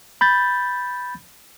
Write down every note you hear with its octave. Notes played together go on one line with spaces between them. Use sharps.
B5 G6 A6